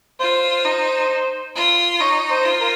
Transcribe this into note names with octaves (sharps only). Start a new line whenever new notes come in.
F4 C5
D#4
F4
D#4 C#5
C5
F4
A#4